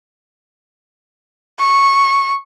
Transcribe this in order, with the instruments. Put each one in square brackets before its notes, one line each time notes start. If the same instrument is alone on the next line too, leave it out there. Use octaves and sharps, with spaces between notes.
[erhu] C#6